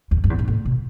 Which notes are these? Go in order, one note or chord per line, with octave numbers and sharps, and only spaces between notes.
E2
F#2
E2
G#2
A2
B2